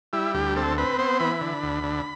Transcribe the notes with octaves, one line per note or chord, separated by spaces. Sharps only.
G3 E4
D2 G4
C4 A4
C4 B4
B3 C5
E3 B5
D3
D2
D3